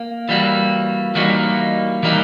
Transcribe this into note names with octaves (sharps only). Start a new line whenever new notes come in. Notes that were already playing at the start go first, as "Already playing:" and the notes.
Already playing: A#3
E3 G3 A#3 D#4 F#4
E3 G3 A#3 D#4 F#4
E3 G3 A#3 D#4 F#4